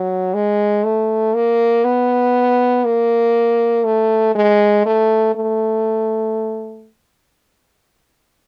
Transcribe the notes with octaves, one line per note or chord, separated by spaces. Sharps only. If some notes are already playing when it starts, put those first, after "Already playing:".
Already playing: F#3
G#3
A3
A#3
B3
A#3
A3
G#3
A3
A3